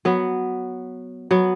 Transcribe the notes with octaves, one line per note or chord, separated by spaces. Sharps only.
F#3 B3
F#3 B3